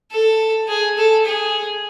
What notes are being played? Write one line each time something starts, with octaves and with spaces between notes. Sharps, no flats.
A4
G#4
A4
G#4